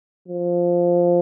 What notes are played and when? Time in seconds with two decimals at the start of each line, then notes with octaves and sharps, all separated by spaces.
0.28 F3